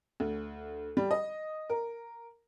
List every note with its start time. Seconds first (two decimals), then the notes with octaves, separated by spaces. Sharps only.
0.20 D2
0.97 G3
1.11 D#5
1.70 A#4